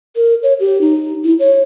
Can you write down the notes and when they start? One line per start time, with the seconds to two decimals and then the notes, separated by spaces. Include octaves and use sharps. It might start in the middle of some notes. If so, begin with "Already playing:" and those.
0.16 A#4
0.43 C#5
0.60 G4
0.81 D#4
1.24 E4
1.40 C#5